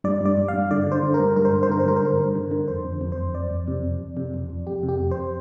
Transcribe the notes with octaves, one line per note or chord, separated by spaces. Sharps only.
G2 D5
G2 D5
G2
G2 F5
D3 D5
D3 C5
D3
A#4
G2
G2 A#4
C5
G2 A#4
C5
D3 A#4
C5
G2 A#4
C5
D3 A#4
G2
D3
D3
F2 C5
F2
F2
C5
F2
F2 D5
F2
C3
F2
F2
C3
F2
F2
F2 G4
C3
G4
F2
C5